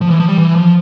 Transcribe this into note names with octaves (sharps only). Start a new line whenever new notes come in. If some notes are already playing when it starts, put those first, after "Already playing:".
F3
E3
F3
G3
E3
F3